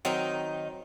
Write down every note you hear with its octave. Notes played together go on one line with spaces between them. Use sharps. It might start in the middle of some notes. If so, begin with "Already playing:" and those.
D#3 F#3 C4 D#4